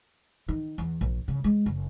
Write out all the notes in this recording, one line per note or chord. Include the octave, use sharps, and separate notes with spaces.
D#3
E2
A#1
C#3
G#3
F#1